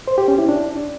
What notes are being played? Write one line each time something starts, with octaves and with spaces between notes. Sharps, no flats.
C5
G4
C#4
E4
D4